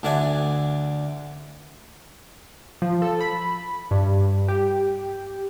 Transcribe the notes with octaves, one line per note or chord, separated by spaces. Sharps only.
D2 D3 D5 E5 F#5 G#5
F3
A4
B5
G2
G4